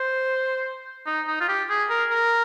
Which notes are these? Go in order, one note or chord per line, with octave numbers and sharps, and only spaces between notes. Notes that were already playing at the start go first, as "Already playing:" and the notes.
Already playing: C5
D#4
D#4
F4
G4
G#4
A#4
A#4